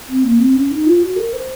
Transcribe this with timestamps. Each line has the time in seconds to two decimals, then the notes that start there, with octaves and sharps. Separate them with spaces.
0.09 C4
0.24 A#3
0.39 C4
0.56 C#4
0.71 D#4
0.86 F4
1.02 F#4
1.16 A#4
1.33 C5